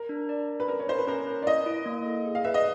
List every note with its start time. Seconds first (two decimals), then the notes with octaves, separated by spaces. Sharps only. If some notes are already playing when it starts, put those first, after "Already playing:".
Already playing: A#4
0.09 D4
0.29 D5
0.49 D5
0.60 B4
0.68 C#4 A#4
0.80 C#5
0.88 C#4 C5
0.98 B4
1.07 C#4 A#4
1.27 C#4
1.42 D5
1.46 E4 D#5
1.66 E4
1.86 A#3
2.05 A4
2.25 G#4
2.35 F5
2.44 B4 E5
2.54 D#5